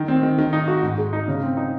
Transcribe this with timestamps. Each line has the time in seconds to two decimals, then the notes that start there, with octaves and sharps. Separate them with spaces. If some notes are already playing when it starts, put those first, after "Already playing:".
Already playing: D#3
0.08 C4
0.23 D#3
0.38 D#3
0.53 D#4
0.68 F#4
0.83 G#2
0.98 G#3
1.13 D#4
1.28 C#3
1.43 C4
1.57 D#4